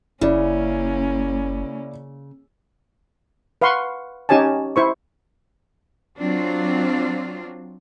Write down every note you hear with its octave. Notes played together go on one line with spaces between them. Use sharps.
F#1 C#3 A#3 C#4 E4 D5
B4 F5 F#5 C6 C#6
C#4 D#4 G4 C#5 G#5 A5
E4 C5 C#6
F#3 C4 D4 F4